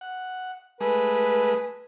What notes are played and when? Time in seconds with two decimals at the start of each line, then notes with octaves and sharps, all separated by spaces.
0.01 F#5
0.81 G#3 A3 G#4 B4